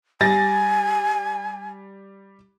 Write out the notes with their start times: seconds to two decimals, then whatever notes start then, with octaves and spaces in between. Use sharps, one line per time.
0.21 G3 G#5 A6 A#6